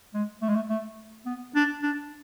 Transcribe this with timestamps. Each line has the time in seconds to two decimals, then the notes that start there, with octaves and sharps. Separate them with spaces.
0.14 G#3
0.42 A3
0.49 G#3
0.55 A3
0.69 A3
1.26 B3
1.55 D4
1.83 D4